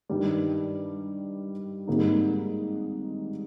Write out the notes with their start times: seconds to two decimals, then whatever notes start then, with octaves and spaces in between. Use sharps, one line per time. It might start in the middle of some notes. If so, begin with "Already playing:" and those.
0.09 G2 D#3 G3
1.87 G#1 G#2 G3 A#3 D#4